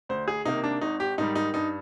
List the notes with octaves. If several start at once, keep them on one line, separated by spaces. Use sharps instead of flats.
D2 C5
G#4
C3 D#3 A#3 D#4
D4
G#1 D#4
G4
G#2 D#3 G3 D#4
D#4
G2 D#4